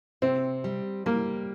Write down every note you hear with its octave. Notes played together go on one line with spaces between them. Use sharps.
C3 C4
G3
G3 A#3